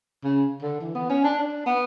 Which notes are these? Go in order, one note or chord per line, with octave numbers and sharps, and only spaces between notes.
C#3
D3
E3
B3
C#4
D4
D4
B3